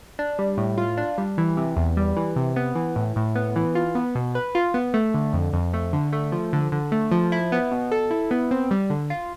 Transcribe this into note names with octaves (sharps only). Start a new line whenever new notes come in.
D4
G3
A2
F4
D4
G3
E3
C3
E2
G3
E3
C3
B3
E3
A2
A2
B3
E3
F4
B3
B2
B4
F4
B3
A3
D3
F2
F2
A3
D3
A3
F3
D3
D3
A3
F3
E4
B3
B2
A4
E4
B3
C4
G3
D3
F4